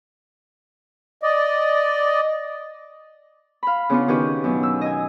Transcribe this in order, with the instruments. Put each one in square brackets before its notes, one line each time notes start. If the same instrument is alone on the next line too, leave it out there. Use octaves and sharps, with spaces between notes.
[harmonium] D5 D#5
[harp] F5 B5
C#3 B3 D4 F4
D#3 C#4 D4 F#4 G4 B4
F#2 B2
E6
D#5 G#5